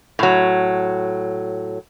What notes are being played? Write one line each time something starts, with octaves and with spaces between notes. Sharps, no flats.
A2 F#3